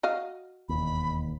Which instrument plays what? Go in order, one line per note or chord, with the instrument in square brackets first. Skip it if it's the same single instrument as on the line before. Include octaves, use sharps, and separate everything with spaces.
[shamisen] F#4 D#5 F5
[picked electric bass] E1 D#2 [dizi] B5